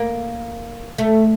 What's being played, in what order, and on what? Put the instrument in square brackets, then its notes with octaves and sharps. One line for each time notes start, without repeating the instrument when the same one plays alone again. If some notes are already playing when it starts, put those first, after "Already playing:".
Already playing: [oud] A#3
A3